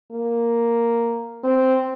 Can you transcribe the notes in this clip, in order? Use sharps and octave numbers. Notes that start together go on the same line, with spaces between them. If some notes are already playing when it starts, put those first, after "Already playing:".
A#3
C4